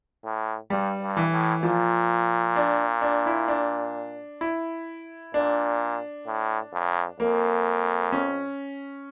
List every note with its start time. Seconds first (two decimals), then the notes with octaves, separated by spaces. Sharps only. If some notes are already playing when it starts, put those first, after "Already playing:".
0.25 A2
0.70 G2 G3
1.02 G2
1.17 E3
1.32 A2
1.63 A#2 F3
2.56 D4
3.02 D4
3.26 E4
3.48 D4
4.41 E4
5.34 A#2 D4
6.27 A2
6.73 F2
7.20 F2 A#3
8.12 C#4